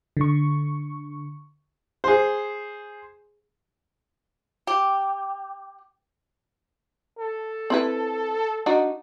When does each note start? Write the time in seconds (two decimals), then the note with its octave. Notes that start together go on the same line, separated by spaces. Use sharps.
0.17 D3 C#6
2.04 G#4 C5
4.67 G4
7.19 A4
7.70 C4 E4 B4
8.66 D4 D#4 F#4